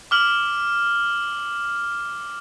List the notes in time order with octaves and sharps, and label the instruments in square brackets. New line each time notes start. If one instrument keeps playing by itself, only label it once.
[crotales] D6 F6 F#7